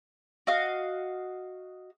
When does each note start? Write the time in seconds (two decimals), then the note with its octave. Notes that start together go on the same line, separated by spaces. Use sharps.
0.47 F#4 D#5 F5